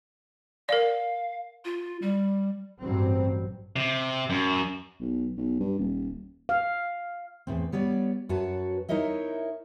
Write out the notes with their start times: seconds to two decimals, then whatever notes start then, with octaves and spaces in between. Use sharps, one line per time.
0.69 A#4 D5 F5
1.65 F4
2.02 G3
2.82 A1 G2 F#3 C4
3.76 C3
4.30 F#2
5.00 B1
5.38 B1
5.60 G2
5.79 D#1
6.49 F5
7.47 E2 A2 C4
7.72 G3 B3 C#5 D5
8.29 F#2 F#4 B4 C#5 A5
8.89 D#4 E4 A#4 C#5 D#5 E5